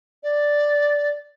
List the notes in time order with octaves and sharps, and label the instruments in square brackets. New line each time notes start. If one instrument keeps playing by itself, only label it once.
[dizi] D5